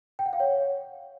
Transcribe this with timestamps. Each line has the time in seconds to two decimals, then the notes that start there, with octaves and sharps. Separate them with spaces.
0.19 G5
0.26 F#5
0.33 F5
0.40 C#5